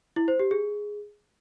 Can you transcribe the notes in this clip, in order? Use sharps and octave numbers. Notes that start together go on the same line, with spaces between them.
E4
C5
G4
G#4